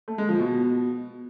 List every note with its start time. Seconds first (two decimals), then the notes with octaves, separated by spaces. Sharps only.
0.08 A3
0.18 G#3
0.29 F3
0.39 B2